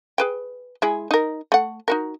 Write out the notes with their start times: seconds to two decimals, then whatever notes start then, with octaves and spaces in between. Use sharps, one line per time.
0.18 G#4 B4 G5
0.82 G#3 E4 G#4
1.11 D#4 A#4
1.52 A3 F#5
1.88 D#4 F#4 A#4